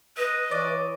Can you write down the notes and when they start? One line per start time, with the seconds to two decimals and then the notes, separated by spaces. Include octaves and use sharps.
0.18 B4 D#5
0.51 E3 C#5 D5